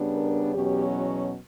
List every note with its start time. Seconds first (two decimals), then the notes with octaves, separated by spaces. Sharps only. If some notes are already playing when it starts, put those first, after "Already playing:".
Already playing: C#3 G3 B3 D4
0.13 A#4
0.54 E2 B2 F#3 C#4 G4
0.96 F#4